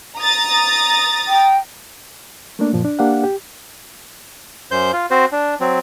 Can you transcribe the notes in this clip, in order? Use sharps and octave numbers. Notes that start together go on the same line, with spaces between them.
A#5 D#6 A6
G5
A3 A#3 D4
F#2 A#2 F3
D4
A#3 D4 G4 F5 F#5
G4
F#2 C5 G6
F4
C4 F#4 C5
D4
F#3 C4